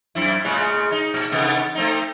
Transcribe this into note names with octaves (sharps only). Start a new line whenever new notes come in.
F#2 C4 E4
A2 C#3 G#3
D#4
A#2
C3 D#3 B3
A3 C4 D#4